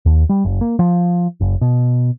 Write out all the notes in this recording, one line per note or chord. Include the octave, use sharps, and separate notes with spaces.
D#2
G3
F#1
A#3
F3
F#1
B2